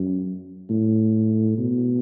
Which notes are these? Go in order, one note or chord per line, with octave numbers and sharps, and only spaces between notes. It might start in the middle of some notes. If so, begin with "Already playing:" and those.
Already playing: F#2
A2
B2